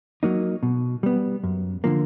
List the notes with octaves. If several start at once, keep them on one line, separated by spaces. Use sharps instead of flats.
F#3 A#3 D#4
B2
G3 B3
F#2
D3 F3 A#3